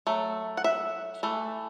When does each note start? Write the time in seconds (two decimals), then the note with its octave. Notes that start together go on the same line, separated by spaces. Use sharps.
0.07 F#3 A3
0.57 F#5
0.64 E5
1.23 E3 A3